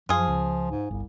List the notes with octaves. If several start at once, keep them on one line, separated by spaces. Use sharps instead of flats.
F#2 F3 F4 G#4
C#2
G#2
G1 C2